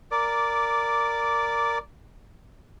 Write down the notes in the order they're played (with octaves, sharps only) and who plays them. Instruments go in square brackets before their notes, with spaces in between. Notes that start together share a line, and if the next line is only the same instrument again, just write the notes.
[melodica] A#4 D5 D6